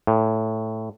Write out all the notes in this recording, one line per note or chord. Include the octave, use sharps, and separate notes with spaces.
A2